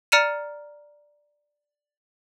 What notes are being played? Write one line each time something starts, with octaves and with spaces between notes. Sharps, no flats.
D5 A#5 F6 C#7 D#7 E7